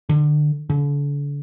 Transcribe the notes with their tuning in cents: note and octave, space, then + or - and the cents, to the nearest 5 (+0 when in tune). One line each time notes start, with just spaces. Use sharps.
D3 +25
D3 -40